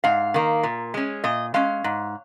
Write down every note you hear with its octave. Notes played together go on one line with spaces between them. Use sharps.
G#2 F5
D#3 A#3
A#2
G#3 C#4
A#2 D#5
G#3 C#4 F5
G#2